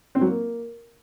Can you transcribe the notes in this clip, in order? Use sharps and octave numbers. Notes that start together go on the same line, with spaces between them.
C4
F#3
A#3